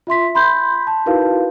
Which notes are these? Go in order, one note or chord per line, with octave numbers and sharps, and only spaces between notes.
F4 E5 C6 B6
B5 C6 G6
A5
D#4 E4 F#4 A#4 B4 F5